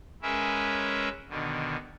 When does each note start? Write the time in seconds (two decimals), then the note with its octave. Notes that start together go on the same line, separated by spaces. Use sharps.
0.22 G#3 C#4 G#4 A#4 B4 E5
1.30 B2 D3 D#3